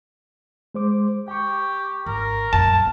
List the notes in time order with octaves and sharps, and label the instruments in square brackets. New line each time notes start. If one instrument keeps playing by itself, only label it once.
[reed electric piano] G#3 C5 D6
[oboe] G4 [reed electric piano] G5 C#6
[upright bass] G#1 [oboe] A#4
[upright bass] A#1 F#2 [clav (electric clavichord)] A5